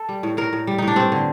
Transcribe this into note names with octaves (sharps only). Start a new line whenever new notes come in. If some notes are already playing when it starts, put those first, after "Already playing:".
Already playing: A4
G3
A2
A2 A#4
A2
G3
A2 D#4
D4
G2 C4
D3